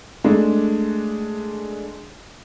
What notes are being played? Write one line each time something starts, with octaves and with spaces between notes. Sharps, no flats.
G#3 A3 D4